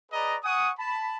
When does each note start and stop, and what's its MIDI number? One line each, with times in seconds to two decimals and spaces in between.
0.11 0.36 68
0.11 0.36 71
0.11 0.36 74
0.11 0.36 75
0.11 0.36 82
0.44 0.70 78
0.44 0.70 80
0.44 0.70 85
0.44 0.70 87
0.78 1.18 81
0.78 1.18 83